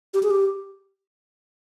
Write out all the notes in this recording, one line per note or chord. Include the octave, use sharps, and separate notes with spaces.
G4
G#4
G4